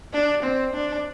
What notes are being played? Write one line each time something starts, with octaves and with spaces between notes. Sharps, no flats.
D4
C4
D4